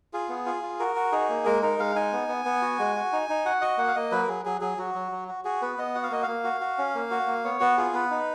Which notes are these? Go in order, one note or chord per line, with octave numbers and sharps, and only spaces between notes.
F4 G#4
B3
F4
F4
F#4 A#4
F#4
D#4 G#4
A#3
G#3 A#4
D#4 A#4
G#3 F5
D#4 G#5
B3
B3
B3
F#4
G#3
F#4
D#4
D#4
F#4 F#5
F#4 D#5
A#3 F#5
F5
A#3 D#5
F#3 B4
A#4
F#3 G#4
F#3 G#4
F#3 G#4
F#3 F#4
F#3
F#3
F#4
F#4 G#4
B3 B4
B3 D#5
F#4 F#5
F5
A#3 D#5
A#3 F5
F#4
F#4
C#4
A#3
F#4
A#3
B3 C#5
B3 F#4
F4 G#4
B3 B4
D#4